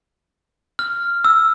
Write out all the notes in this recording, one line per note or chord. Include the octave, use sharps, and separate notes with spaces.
F6
E6